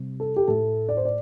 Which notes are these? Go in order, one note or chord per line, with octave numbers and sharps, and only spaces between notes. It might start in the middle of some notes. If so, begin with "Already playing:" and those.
Already playing: C3 G3
A4
G4
A2 A3 A4
D5
C5
D5